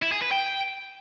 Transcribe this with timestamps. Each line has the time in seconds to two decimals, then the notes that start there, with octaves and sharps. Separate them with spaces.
0.02 E4
0.12 G#4
0.22 B4
0.32 G5